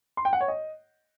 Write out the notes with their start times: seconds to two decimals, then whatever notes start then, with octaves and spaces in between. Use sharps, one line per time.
0.17 C6
0.25 G5
0.33 F#5
0.41 C#5
0.48 D#5